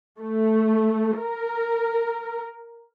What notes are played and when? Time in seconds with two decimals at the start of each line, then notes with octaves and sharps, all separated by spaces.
0.21 A3
1.20 A#4